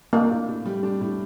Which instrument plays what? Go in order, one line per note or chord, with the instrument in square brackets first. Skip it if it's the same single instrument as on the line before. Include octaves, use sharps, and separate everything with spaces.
[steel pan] A#3 [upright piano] D4
[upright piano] A2
A2
G3
D4
A2